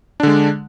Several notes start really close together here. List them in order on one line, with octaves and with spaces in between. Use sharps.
D4 D3 G#3